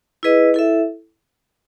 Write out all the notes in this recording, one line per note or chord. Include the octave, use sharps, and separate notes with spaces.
E4 G#4 B4 D#5
E4 A4 E5